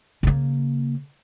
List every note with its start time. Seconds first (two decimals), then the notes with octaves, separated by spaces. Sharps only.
0.23 C#3 A#3